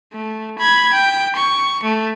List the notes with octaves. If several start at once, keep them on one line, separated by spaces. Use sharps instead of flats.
A3
B5 G#6
G5
C#6
A3